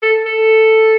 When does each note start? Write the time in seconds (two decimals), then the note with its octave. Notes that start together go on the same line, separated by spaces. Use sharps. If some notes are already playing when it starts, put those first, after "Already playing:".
0.03 A4
0.26 A4